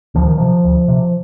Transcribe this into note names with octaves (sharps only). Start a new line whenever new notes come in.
D2 F3
D#3
C3 F3
D2
C3